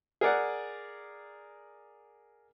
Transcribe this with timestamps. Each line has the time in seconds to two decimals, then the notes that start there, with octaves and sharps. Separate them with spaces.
0.21 G#4 A#4 D5 F#5